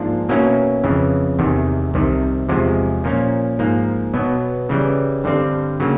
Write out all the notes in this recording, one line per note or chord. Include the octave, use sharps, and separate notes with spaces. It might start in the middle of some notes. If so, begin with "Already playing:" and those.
Already playing: G#2 F3 A#3 D4 F4
B2 F#3 A#3 C#4 E4
F2 C#3 E3
E2 C3 D#3
C2 C3 D#3
E2 C3 F3 G#3
A#2 F3 A#3 C#4
G#2 F3 A#3
B2 F#3 B3
C#3 E3 G3
G2 D3 G3 C4
C#3 F#3 A#3